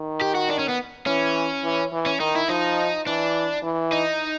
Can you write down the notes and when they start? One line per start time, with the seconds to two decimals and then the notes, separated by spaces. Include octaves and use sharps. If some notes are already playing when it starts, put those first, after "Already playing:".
Already playing: D#3
0.21 G4
0.35 F#4
0.50 D4
0.60 C#4
0.69 B3
1.06 E3 C#4
1.64 E3
1.93 E3
2.06 C#4
2.20 D#3 D#4
2.35 E4
2.49 F3 D#4
3.06 E3 D4
3.63 E3
3.92 D#4